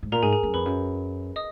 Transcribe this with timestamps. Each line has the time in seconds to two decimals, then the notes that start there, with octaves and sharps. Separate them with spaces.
0.03 G#2
0.12 A#2 A#4 A#5
0.22 G#2 G#4 G#5
0.32 G#4 G#5
0.43 F#2
0.54 F2 B4 B5
0.65 F#2
1.36 D#5 D#6